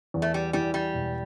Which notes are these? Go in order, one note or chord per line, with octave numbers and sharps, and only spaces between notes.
E2
A3
G3
E3 G3
G3
E1